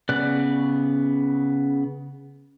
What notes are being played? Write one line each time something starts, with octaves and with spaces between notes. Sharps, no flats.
C#3 B3 D5 F#6